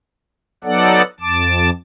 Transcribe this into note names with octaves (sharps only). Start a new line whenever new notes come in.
F#3 B3 D#4 A4 D5 F#5
F2 A5 D6